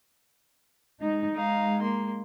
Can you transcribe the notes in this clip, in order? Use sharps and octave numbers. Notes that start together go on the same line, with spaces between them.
G#3 D#4
G#3 D#4 F5
A#3 C6